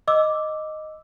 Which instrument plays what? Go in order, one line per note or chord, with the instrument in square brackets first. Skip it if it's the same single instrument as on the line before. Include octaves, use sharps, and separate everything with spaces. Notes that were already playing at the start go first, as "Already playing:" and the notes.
[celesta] D#5 D6 E6